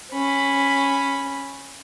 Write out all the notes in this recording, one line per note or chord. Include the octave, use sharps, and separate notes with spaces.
C#4 B5